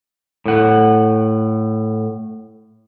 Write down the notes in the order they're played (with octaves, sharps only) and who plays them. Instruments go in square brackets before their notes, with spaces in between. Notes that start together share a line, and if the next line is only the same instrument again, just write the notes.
[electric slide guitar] A2 F#5